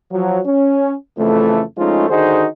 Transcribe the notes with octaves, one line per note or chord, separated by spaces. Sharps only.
F3 F#3
C#4
F2 C#3 E3 A3
F3 G#3 A3 C#4 D#4 F4
D3 D#3 D#4 F#4 G#4 C5